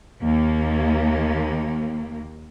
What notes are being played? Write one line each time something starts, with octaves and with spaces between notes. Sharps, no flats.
D#2 A#3